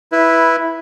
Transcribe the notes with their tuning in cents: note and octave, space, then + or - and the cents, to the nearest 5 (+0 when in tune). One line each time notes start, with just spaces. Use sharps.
E4 +0 B4 -10